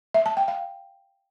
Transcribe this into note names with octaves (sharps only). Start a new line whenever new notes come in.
E5
A5
G5
F5